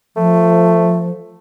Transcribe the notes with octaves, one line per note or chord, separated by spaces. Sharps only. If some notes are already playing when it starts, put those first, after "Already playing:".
F3 A3